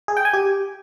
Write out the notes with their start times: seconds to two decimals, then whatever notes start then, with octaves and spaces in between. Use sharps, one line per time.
0.08 G#4
0.17 G5
0.25 G#5
0.33 G4